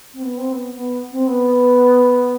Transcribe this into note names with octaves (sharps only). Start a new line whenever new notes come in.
C4
B3
C4
B3
B3
C4
B3